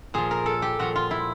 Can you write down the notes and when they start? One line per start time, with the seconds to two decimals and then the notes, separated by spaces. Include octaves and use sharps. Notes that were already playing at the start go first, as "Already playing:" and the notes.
0.14 A#2 F3 G#4
0.31 A#4
0.46 A4
0.62 G4
0.79 A#2 F3 F#4
0.95 F4
1.11 E4